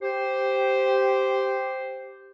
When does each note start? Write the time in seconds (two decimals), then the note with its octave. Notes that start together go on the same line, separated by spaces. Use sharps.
0.02 G4 C5